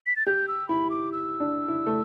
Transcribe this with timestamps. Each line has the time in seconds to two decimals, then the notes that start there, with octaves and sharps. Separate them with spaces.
0.06 B6
0.16 A6
0.26 G4 G6
0.48 E6
0.69 E4 B5
0.90 D6
1.12 E6
1.40 D4
1.68 E4
1.86 A3